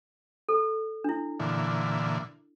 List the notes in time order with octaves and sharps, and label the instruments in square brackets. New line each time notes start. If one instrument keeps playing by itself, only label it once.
[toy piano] A4
D4 E4
[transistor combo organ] A#2 D3 E3